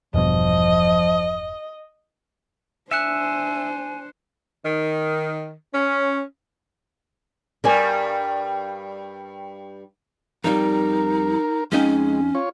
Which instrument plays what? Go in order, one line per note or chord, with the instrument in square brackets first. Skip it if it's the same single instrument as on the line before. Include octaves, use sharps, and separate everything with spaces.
[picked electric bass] E1 G2 B2 [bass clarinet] F3 [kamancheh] D#5
[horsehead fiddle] D4 C5 [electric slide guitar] E5 [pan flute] G#5 [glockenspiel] F#6 C#7 E7
[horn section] D#3
C#4
[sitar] G2 G3 [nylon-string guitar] A#4 D5 G#5
[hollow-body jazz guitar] F2 G3 [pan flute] D#4 [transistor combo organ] A#4
[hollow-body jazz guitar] F2 D#4 G5 [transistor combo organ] G#3 [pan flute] C#4
[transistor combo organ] F4 C#5